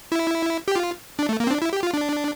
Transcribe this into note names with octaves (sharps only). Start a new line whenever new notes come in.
E4
G4
F4
D4
A3
A#3
C4
D4
E4
G4
F4
D4